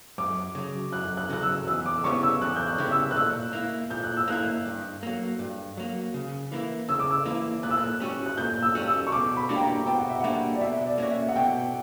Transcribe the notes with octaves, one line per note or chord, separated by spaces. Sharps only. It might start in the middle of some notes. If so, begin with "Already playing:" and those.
F#2 D6
C#3 F#3
F#2 F#6
F#6
C#3 F#3 F#6
E6
E2 E6
D6
C#3 G3 B3 E4 C#6
E6
E2 F#6
G6
F#6
C#3 G3 B3 E4
E6
F#6
A#2 E6
A#3 E4
A#2 G6
F#6
E6
A#3 E4 F#6
G2
F#3 A#3
G2
F#3 A#3
C#3
E3 A#3 E4
C#3 E6
D6
E6
E3 A#3 E4
A#2 F#6
E6
F#6
G3 C#4 F#4
F#6
A#2 G6
E6
G3 C#4 F#4
E6
C#6
B2 D6
B5
G3 A#3 D4 F#4
G5
A#5
B2 G5
F#5
E5
G3 A#3 D4 F#4 F#5
D5
B2 E5
D5
A#3 C#4 F#4
E5
F#5
B2 G5